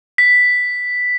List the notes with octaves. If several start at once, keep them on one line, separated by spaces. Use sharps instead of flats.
B6